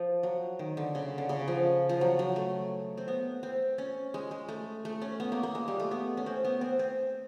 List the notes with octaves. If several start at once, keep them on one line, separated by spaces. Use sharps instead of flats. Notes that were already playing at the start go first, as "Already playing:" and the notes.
Already playing: F3
F#3
D#3
D3
C#3
D3
C#3
F3
F3
F#3
F#3
A3
C4
B3
C4
C#4
G#3
G#3
A3
A3
C#4
B3
A#3
A#3
G#3
G3
A3
B3
C#4
C4
B3
C4
C4